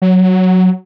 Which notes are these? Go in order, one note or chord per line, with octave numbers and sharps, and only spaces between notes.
F#3